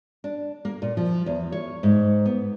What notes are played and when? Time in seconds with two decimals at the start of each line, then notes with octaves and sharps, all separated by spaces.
0.24 D4
0.65 A#3
0.82 A#2
0.97 F3
1.26 E2
1.52 C#5
1.83 G#2
2.25 B3